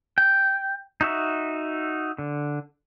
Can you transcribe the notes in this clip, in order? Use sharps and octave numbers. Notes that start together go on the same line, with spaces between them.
G5
D#4 F#4 E5
D3